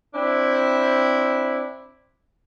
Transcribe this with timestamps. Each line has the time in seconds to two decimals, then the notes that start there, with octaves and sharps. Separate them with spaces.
0.13 C4 D4 E4